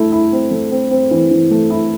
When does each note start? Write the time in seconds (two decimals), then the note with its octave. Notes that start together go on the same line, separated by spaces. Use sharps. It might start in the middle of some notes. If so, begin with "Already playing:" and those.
Already playing: A3 E4
0.12 E4
0.32 C4
0.51 A3
0.71 C4
0.91 C4
1.11 E3
1.31 E3
1.51 A3
1.70 E4